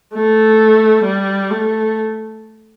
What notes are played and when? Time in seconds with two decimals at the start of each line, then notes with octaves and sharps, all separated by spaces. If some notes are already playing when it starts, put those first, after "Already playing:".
0.14 A3
1.04 G3
1.50 A3